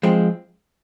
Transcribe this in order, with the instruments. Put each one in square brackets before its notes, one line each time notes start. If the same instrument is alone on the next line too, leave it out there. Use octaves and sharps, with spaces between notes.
[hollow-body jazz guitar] F3 G#3 C4